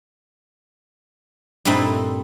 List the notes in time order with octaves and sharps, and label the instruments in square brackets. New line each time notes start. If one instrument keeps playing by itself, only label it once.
[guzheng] G2 A#2 A3 C4 D#4 E4